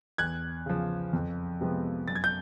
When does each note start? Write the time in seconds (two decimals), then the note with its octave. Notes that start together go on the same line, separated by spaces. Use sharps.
0.18 E2 F#6 G#6
0.66 C#3 F3
1.13 F2
1.61 C3 F3 G#3 B3
2.08 F#2 A6
2.15 G#6
2.24 G6